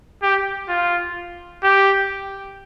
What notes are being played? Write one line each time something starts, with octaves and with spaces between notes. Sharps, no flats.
G4
F4
G4